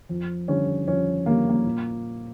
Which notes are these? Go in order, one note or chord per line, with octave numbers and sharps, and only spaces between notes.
F2
D3 G3 C#4
F2 C#4
D3 G3 A#3
A#3
A#2